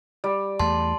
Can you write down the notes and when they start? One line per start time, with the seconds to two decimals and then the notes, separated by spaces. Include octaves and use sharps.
0.24 G3
0.59 E2 A3 A5 C6